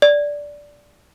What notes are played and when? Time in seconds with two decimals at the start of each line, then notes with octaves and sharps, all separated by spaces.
0.02 D5